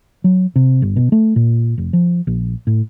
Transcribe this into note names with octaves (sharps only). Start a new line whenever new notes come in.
F#3
C3
G1
B2
A3
A#2
F1
F3
A#1
A2